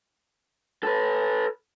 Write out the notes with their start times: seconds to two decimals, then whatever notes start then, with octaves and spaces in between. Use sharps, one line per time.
0.83 A4 B4